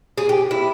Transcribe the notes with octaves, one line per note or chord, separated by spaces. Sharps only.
G#4
G4
E4